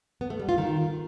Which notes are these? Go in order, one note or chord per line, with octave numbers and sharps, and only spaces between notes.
B3
A3
G3
F4
D#3